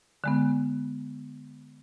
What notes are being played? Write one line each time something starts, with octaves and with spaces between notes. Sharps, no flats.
D3 G#3 B3